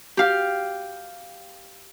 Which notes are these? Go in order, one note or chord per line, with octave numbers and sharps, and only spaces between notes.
G4 F5